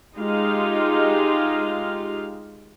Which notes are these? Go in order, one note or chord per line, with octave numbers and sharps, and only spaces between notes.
G#3 D#4 F4 G4 F5